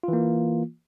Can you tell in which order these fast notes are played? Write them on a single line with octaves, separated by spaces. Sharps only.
F4 E3 A#3